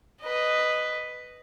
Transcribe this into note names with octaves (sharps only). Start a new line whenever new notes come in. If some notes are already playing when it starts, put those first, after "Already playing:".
B4 D#5